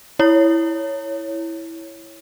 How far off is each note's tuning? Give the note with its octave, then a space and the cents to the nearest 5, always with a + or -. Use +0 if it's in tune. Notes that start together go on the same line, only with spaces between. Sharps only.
E4 +0 C#5 +0